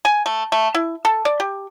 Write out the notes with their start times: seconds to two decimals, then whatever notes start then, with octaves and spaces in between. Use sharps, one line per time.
0.05 G#5
0.26 A3
0.52 A3
0.75 E4
1.05 A4
1.25 D5
1.40 G4